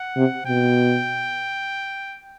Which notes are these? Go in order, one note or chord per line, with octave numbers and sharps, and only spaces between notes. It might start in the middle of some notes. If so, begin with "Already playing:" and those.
Already playing: F#5
C3
B2 G5